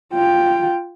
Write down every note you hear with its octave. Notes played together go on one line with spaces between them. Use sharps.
F4 G5